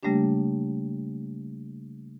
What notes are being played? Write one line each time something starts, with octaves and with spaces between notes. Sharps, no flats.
C#3 G3 A3 A#3 D4 G4